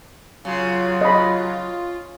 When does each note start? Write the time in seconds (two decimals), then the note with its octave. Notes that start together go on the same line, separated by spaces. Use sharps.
0.45 C#3 F#3 F4
1.01 D#5 B5